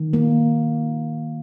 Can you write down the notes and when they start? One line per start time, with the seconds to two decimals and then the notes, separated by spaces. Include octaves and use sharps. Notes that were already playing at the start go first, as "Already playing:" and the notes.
Already playing: D#3
0.13 A#3